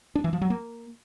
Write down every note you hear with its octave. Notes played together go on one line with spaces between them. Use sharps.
D4
E3
F3
F#3
A#3